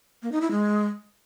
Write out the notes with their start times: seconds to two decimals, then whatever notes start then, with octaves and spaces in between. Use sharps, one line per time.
0.22 A#3
0.32 D#4
0.41 E4
0.51 G#3